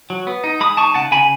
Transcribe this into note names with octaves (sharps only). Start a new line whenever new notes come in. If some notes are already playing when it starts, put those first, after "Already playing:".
F#3
B3
D#4
G#3 B5 D#6
D#4 A5 C#6
C#3 F#5 A5
C#3 G#5 B5